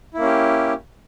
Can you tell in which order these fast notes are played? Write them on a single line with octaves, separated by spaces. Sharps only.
E4 A#3 C#4 G4